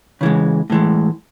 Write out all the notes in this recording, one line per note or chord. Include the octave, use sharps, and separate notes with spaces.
C#3 E3 G#3
A2 E3 G#3